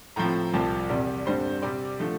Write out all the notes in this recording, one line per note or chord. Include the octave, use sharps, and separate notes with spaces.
A2 F3 C4 A#5
C2 C3 F3 C4 A5
E2 C3 G3 D5
G2 D3 G3 C4 C5
C3 G3 C4 D5
D3 F3 A3